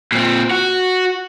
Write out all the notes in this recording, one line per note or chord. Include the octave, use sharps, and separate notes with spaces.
A#2 C4
F#4